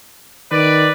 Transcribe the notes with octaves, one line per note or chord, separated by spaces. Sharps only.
D#3 B4 D5